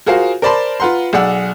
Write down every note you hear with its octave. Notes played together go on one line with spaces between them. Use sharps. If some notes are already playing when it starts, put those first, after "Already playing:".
F4 F#4 G#4 A#4 C5 F5
A#4 C5 D5 A5 B5 C6
F4 B4 F#5 A#5 C6
B1 G#4 D5 F#5 E6